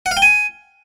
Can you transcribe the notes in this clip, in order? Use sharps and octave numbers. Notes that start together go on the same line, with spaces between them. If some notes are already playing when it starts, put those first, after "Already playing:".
F#5
F5
G5
G#5